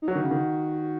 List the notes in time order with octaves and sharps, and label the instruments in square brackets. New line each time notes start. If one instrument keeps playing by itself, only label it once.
[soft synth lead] D#4
[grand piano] F#3 [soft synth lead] F#4
[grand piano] D#3
C#3
D#3